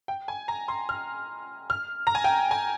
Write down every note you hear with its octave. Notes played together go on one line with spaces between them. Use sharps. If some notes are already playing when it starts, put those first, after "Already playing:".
G5
G#5
A#5
C6
F6
F6
A#5
G#5
G5
G#5